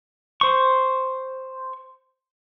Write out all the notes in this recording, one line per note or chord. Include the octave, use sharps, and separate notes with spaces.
C5 C#6